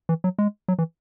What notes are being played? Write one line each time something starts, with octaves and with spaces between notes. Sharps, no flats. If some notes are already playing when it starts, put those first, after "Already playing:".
E3
F#3
G#3
F#3
E3